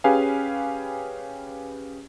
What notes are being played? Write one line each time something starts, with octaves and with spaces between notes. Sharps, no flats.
C#4 G4 G#4 B4 F5 G#5